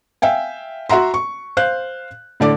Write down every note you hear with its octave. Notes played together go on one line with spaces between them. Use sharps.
E5 F5 G5 G#5
F#4 E5 F#5 A#5 C6
C#6
C5 F5 F#6
A2 D3 D5 D6